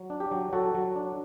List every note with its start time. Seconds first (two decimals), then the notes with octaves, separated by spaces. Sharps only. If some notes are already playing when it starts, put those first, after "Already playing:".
Already playing: F#3
0.10 D4
0.20 G4
0.31 F#3
0.53 F#3 F#4 A4
0.75 F#3
0.96 D4